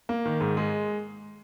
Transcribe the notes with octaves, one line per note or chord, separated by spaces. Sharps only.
A#3
D#3
G#2
G#3